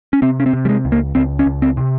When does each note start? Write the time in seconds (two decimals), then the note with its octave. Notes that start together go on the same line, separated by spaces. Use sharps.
0.13 C#4
0.22 C3 C4
0.40 C#4
0.46 C4
0.53 C3
0.65 G3
0.69 G#3
0.85 C#2
0.92 A#3
1.15 C#2 C4
1.39 C#4
1.46 C#2
1.62 C4
1.77 C3